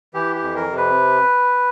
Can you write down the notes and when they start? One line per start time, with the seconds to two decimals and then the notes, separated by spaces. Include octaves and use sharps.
0.14 E3 G4
0.35 G4
0.42 F2
0.56 A#4
0.70 C3
0.77 B4